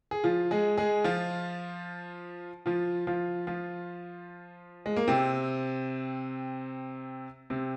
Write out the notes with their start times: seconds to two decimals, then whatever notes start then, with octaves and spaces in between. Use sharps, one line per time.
0.11 G#4
0.24 F3 F4
0.51 G#3 G#4
0.77 G#3 G#4
1.04 F3 F4
2.66 F3 F4
3.07 F3 F4
3.47 F3 F4
4.86 G#3
4.96 A#3
5.08 C3 C4
7.50 C3 C4